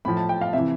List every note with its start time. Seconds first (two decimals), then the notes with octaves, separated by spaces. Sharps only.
0.05 A2 F3 B5
0.17 A5
0.29 G5
0.41 F5
0.53 C3 E3 E5